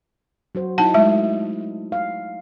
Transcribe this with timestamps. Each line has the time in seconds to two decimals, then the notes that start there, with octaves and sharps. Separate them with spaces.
0.55 F#3 F#4 C5
0.78 F#3 D#4 E4 F#5 A5
0.94 G#3 A3 E5
1.92 F5